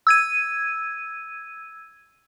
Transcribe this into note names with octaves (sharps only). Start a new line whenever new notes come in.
E6 G#6 D#7